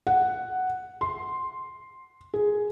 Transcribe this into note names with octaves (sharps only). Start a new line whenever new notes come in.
F#5
C6
G#4